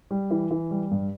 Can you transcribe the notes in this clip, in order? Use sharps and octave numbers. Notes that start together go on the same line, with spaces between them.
G3
E3
E3
G3
G2